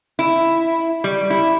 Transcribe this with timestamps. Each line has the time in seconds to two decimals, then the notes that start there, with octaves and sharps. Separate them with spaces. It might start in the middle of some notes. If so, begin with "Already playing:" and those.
0.19 E4
1.04 G3
1.30 E4